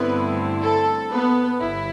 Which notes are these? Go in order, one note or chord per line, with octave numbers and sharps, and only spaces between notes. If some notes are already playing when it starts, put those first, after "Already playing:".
Already playing: G2 D3 A3 B3 C4 E4 B4
A4
B3 B4
G1 E4